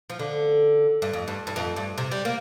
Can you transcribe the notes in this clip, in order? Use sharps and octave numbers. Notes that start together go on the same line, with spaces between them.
F3
D3
G2
F2
G2
G2
F2
G2
C3
G3
A#3